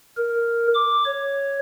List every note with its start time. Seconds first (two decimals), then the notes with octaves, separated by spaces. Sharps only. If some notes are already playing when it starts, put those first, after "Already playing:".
0.17 A#4
0.75 D6
1.06 C#5